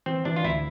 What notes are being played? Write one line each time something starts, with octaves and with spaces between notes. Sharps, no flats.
E3 C4
E3 D4
F4
D2 E4